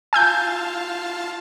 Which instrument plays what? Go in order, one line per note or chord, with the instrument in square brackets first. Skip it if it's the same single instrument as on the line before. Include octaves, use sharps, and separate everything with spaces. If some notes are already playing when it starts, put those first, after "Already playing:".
[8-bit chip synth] F4 F5 A5 [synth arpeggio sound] G#5 E6 G6